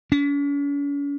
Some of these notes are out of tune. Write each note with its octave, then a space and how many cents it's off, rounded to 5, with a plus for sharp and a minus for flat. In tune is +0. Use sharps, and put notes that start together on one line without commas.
C#4 +45